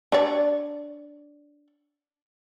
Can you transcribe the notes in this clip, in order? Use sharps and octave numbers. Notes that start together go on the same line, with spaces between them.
D4 C#5 D5